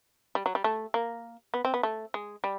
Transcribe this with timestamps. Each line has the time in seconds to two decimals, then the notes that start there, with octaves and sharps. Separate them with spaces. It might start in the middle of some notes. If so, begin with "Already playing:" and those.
0.35 G3
0.46 F#3
0.55 G3
0.64 A3
0.94 A#3
1.54 B3
1.65 C4
1.74 B3
1.83 A3
2.14 G#3
2.44 G3